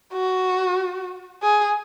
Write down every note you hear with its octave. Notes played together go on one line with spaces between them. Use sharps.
F#4
G#4